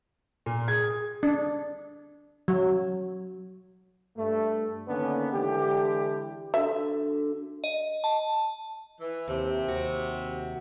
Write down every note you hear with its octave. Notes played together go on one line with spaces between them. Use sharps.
A#2
G#4 G#6
D4
F#3
G2 A3
D3 D#3 A#3 B3 C#4 D4
D3 E3 G#3 G4
D3 F#4 E5
D#5
A5
E3
D#2 C3
D#2 F#4